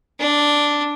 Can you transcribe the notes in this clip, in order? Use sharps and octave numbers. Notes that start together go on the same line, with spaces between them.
D4